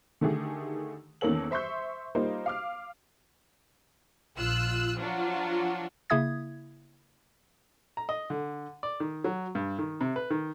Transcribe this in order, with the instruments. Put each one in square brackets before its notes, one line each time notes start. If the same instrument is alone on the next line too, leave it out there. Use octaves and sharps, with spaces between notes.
[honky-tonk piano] D3 D#3 A3 G4 G#4
E2 D#3 A#3 C#4 A4 F#7
C5 E5 C6 C#6 G6
G3 A#3 D#4 F4 C5
F5 D6 F6
[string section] A#1 F4 E6 F#6
F3 F#3 D4 F4
[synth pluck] C#3 A#3 E4 E5 D#6 G#6
[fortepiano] A#5
D#5
D3
D5
D#3
F#3
G2
D#3
C3
B4
D#3